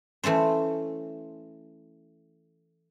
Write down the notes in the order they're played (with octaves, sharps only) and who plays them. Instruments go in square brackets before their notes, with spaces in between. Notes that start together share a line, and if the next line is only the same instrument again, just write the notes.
[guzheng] E3 A3 C#4 C5